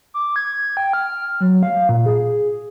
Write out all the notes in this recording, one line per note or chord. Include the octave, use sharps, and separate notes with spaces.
D6
G#6
G5
F6
F#3
F5
A#2
G#4